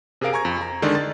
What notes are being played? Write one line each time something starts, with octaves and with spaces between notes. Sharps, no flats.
C3 G#4 A#4 F5 D7
G#5 A#5 C#6 G#6
F2
A#5
D3 D#3 G#3 D5
A6